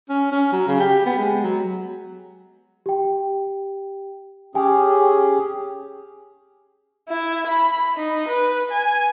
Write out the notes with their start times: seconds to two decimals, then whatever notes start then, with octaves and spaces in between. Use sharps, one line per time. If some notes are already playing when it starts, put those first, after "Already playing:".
0.09 C#4
0.32 C#4
0.52 F#3
0.67 C#3
0.80 G4
1.06 B3
1.19 G#3
1.44 F#3
2.86 G4 G5
4.55 C#4 G4 G#4 G5 G#5
7.09 E4
7.47 B5
7.97 D#4
8.28 B4
8.71 G#5